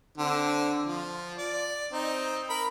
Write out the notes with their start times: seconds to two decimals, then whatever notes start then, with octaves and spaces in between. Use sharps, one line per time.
0.18 D3 C4
0.86 F3
1.38 D5
1.92 C4 D#4
2.50 A#4 B5